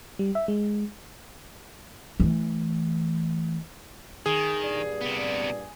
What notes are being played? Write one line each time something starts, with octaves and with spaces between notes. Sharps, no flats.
G3
E5
G#3
E3 A3
D#3 G#4
G2 A#2 D5
C3 B3